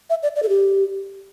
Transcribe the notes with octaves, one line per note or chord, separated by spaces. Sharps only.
E5
D5
D5
A4
G4